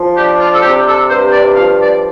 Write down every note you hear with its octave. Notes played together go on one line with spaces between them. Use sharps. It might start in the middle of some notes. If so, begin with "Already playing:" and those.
Already playing: F3
D4 G4
F4
A4
C3 G4
A4
G2 C5
D5
F3 F5
D5